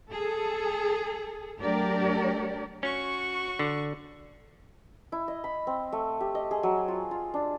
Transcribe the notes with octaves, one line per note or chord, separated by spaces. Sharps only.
G#4 A4
F#3 A3 D4 G4 A#4 D5
C#4 F#4 C#6
D3
E4
D#5
B5
C4
A3
G4
D#5
G#4
F#3
F4
F4
D4